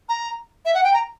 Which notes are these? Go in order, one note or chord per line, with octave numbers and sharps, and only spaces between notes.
A#5
E5
F#5
G5
A#5